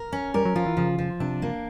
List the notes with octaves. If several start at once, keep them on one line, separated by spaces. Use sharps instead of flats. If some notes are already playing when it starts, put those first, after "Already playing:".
Already playing: A#4
C#4
G3 A#4
F#3
F3 F4
E3
C#3 F3
F3
C3 D4
A#3